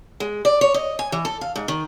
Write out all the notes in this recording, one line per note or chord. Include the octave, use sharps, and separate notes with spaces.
G#3
D5
C#5
D#5
G#5
E3
A4
F5
G#2
D#3